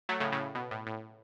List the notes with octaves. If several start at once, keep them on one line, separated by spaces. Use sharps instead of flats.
F#3 A3
A2 C#3
A2 C#3
B2
A2
A2